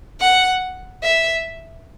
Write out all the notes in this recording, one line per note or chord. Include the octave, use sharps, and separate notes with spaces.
F#5
E5